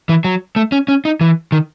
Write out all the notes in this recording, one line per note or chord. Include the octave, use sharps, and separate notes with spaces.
E3
F#3
A3
C#4
C#4
D#4
E3
D#3